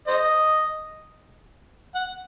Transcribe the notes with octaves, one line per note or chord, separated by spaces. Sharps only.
C5 D#5
F#5